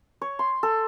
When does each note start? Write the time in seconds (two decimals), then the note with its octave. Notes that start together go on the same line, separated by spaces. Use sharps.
0.21 C#5
0.39 C6
0.63 A4